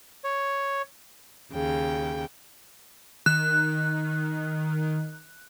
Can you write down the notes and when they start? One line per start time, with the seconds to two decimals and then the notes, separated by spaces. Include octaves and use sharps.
0.24 C#5
1.52 D#2 C#3 G5
3.26 D#3 F#6